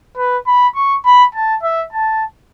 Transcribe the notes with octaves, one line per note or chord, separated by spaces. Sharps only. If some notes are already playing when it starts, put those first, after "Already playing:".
B4
B5
C#6
B5
A5
E5
A5